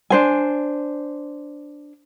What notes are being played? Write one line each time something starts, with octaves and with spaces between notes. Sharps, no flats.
D4 C5 G#5